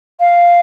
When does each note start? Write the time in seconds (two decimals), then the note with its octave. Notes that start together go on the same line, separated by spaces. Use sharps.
0.20 F5